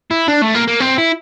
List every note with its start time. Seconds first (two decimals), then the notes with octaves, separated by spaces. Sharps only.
0.11 E4
0.28 D4
0.42 A3
0.54 A#3
0.67 A#3
0.80 C4
0.98 E4